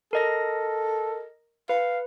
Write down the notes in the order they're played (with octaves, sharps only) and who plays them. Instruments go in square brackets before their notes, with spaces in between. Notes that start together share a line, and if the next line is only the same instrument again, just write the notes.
[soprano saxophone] A4 [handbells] A#4 D#5 A#6
[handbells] B4 [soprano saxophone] F5